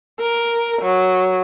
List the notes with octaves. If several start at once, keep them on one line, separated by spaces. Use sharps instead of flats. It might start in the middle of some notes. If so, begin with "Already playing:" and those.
A#4
F#3